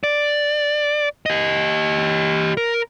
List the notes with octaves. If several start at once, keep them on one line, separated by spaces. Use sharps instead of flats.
D5
G4 D#5
A#4